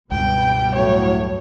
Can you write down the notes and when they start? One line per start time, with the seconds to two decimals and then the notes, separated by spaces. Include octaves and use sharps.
0.11 C#2 G2 B2 G3 B3 G5
0.75 A2 F#3 C#5